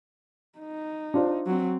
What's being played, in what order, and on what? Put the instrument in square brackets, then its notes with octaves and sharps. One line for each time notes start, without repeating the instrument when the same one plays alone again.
[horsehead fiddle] D#4
[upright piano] D4 F4 C5
[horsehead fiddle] F#3 C4